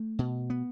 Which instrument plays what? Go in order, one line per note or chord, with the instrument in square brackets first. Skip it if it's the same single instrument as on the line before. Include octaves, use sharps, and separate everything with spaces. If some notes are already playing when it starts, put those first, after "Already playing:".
Already playing: [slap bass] A3
B2
B3